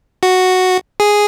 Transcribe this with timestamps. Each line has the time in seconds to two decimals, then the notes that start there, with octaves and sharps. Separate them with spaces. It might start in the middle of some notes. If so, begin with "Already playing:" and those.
0.23 F#4
1.00 G#4